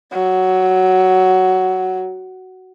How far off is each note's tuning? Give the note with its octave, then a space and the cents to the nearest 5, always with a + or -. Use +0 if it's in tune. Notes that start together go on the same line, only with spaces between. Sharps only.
F#3 +10